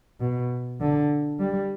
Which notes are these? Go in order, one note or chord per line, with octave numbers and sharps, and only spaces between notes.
B2
D3
G3